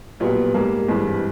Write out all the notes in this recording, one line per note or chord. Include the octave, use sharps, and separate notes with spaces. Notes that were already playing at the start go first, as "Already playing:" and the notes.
B1 A#2 G3 B3
G#2 G3 A#3
G#1 G2 E3